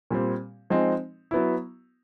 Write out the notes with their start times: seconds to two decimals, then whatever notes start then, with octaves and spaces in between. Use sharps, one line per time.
0.11 A#2 G3 C4
0.70 F3 G#3 C4 D#4
1.31 F#3 B3 E4